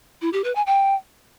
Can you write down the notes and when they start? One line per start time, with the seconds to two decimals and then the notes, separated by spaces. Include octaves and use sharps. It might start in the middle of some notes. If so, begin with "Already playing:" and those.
0.22 E4
0.33 G4
0.44 B4
0.55 G#5
0.66 G5